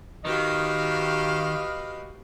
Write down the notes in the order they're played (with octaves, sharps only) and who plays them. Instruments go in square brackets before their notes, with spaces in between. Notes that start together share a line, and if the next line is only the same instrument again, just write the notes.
[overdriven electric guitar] D#3 [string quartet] F#4 G4 F5 [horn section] B4 D#5 [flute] F6